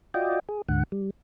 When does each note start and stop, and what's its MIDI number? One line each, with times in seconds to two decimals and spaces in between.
0.14 0.39 65
0.14 0.39 66
0.14 0.39 74
0.14 0.39 75
0.14 0.39 79
0.49 0.62 68
0.69 0.83 38
0.69 0.83 44
0.69 0.83 50
0.69 0.83 78
0.92 1.10 55